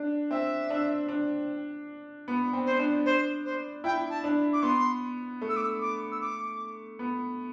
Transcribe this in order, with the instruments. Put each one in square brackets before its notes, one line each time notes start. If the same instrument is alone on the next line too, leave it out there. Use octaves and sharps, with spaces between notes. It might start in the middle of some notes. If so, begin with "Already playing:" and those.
Already playing: [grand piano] D4
[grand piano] C4 [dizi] E5
[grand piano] D4
D4
B3
C4
[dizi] C5
[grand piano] D4
[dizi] C5
C5
[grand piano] E4 [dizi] G5
[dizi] A5
[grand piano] D4
[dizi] D6
[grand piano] B3 [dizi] C6
[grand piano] A3
[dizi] E6
D6
E6
D6
E6
D6
[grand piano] B3